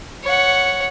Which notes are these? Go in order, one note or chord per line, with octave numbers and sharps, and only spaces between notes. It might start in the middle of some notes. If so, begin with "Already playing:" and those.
C#5 F#5